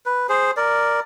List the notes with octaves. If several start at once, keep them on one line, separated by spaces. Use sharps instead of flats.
B4
G#4 C5
A#4 D5